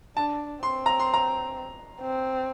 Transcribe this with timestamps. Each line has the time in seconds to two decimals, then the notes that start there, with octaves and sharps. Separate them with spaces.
0.17 D4 A5
0.63 C4 C6
0.86 A#5
0.99 C6
1.14 A#5
2.01 C4